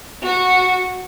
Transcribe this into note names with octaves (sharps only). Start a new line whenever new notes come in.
F#4